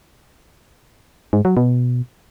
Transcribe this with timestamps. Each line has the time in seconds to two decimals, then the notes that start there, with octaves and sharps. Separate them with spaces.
1.33 G#2
1.45 F#3
1.57 B2